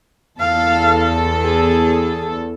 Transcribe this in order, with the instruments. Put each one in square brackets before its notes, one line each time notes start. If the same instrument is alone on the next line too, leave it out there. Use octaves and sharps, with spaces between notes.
[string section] E2 A4 [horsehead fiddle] F5
[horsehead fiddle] G#4